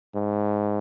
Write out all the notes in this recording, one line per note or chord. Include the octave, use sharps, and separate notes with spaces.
G#2